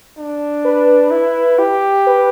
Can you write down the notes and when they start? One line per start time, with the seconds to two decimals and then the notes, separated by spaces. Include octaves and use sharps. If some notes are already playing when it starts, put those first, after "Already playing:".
0.17 D4
0.65 B4
1.11 E4
1.59 G4
2.06 B4